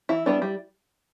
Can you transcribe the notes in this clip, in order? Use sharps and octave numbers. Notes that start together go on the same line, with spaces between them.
E3 E4
G3 B3 D4
G3